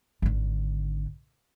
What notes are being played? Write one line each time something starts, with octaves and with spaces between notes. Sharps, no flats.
G#1 D3